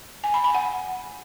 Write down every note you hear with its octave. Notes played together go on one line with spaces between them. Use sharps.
G#5
B5
B5
F#5